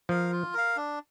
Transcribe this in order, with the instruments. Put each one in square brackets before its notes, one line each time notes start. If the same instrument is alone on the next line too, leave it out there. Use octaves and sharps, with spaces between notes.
[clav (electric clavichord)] F3 [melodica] A#4 F5
[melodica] F4
A#4 F5
D4